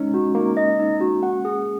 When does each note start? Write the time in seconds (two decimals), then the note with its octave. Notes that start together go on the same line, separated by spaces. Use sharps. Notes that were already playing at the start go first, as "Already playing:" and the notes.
Already playing: G#3 C#4 D#4
0.14 F#4
0.35 A#3 D#4
0.57 D#5
0.80 D#4
1.00 F#4
1.23 F#5
1.45 G#4